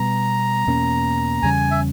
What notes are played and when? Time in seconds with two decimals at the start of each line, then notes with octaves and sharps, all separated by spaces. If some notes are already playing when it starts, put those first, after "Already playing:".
Already playing: B2 G3 B3 A#5
0.67 E2 B2 A#3 C#4
1.43 E2 C#3 G3 C#4 G#5
1.71 E5